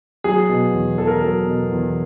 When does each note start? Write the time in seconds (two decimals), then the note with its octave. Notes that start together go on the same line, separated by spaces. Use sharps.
0.24 F#3 G#4
0.49 B2
0.73 E2
0.98 E2 A4
1.07 A#4
1.18 F#3 A4
1.46 B2
1.72 E2